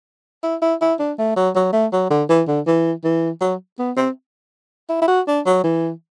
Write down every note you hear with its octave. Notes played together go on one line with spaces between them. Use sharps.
E4
E4
E4
D4
A3
F#3
F#3
A3
F#3
D3
E3
D3
E3
E3
F#3
B3
C4
E4
E4
F#4
D4
F#3
E3